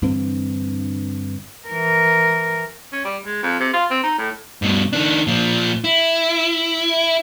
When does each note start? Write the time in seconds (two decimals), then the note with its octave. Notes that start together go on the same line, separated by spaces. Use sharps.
0.02 G2 D3 E3 C4
1.68 E3 A#4
2.93 C#4
3.05 G3
3.25 G#3
3.43 F2
3.60 C3
3.73 F4
3.91 C4
4.03 D#4
4.18 A2
4.62 G2 B2
4.93 D#3 D4
5.27 A#2 F3
5.84 E4